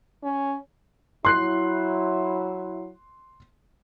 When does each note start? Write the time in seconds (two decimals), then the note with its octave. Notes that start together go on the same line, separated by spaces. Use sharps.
0.24 C#4
1.25 F#3 E4 C6 F#6 C7